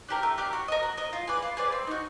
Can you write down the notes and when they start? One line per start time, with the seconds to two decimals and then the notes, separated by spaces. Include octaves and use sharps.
0.08 D4 G4 A#4
0.23 A3
0.38 D4 G4 A#4
0.53 F#4
0.68 A#4 D#5
0.83 F#4
0.97 A#4 D#5
1.13 F4
1.27 G#4 B4 D5
1.42 F4
1.57 G#4 B4 D5
1.72 C4
1.87 D#4 F#4